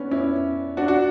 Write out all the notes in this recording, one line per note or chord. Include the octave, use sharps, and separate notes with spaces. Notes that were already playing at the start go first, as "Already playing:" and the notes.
Already playing: B3 C#4 D4
C#4 E4
D4 F#4
F#4